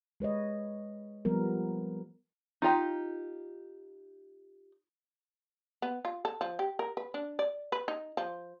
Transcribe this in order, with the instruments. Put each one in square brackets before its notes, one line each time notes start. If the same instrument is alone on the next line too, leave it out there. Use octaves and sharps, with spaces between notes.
[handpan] G#3 B4 C#5 D#5
F3 G3 B3 A#4
[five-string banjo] D#4 F4 G4 A#5
[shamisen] B3
F4
A4
F3
G4
A#4
B4
D4
D5
B4
D#4
F3